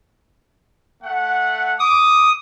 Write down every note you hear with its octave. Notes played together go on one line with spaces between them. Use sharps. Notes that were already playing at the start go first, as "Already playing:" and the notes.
A3 F#5
D6 D#6